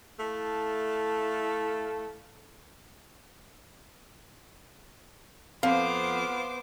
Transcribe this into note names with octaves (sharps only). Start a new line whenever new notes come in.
A3 E4 A4 F5 A5
F2 B3 C5 F5 D6